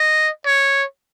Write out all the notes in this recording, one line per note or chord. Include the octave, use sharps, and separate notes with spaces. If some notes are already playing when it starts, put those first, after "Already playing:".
Already playing: D#5
C#5